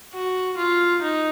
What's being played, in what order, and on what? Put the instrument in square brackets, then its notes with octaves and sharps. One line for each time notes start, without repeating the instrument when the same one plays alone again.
[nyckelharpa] F#4
F4
D#4